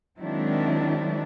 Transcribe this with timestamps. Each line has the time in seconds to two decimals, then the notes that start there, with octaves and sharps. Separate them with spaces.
0.20 D#3 F#3 G#3 C4 D4 E4